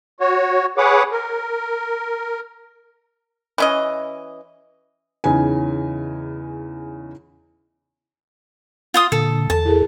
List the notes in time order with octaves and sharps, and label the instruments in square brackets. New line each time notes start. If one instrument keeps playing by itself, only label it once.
[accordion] F#4 C#5
G#4 B4 C#5 F#5 D6
A#4
[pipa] E3 C#4 D#5
[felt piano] E2 C#3 D#4 G#5
[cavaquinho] F4 C6 D#6
[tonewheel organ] A#2 D3 [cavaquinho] A4
[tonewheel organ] E2 A4 [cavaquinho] A5
[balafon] E4 G#4 A#4